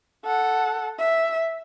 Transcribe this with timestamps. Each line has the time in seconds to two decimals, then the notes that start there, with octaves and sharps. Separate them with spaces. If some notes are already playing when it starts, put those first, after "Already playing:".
0.25 A4 F#5
0.99 E5